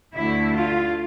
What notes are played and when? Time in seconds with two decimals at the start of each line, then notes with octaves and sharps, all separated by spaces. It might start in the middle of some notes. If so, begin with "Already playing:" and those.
0.14 D2 D3 A3 E4
0.54 F4